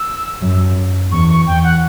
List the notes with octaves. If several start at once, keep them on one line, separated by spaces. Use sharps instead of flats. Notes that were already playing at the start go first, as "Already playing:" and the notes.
Already playing: E6
F#2
E2 C#6
C#6
E2 G5
F#5